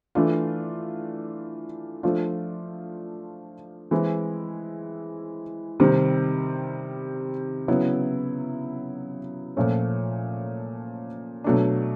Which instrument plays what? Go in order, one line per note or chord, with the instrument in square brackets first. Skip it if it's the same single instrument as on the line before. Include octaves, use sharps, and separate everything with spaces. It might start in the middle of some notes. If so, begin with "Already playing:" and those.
[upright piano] E3 A3 D4 F4
F3 A3 D4 F4
E3 G#3 C4 E4
C3 D#3 G3 C4
C#3 F#3 B3 E4
A#2 F3 A3 C#4
B2 F#3 A3 D4